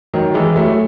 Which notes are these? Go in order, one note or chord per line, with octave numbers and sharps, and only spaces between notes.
D#3 F#3
E3 G#3
F#3 A3